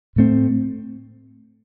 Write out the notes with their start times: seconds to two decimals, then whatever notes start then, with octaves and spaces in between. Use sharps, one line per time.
0.16 A2 A3 C4